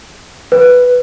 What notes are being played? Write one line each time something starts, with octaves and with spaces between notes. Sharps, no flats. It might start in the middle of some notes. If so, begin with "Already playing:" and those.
B4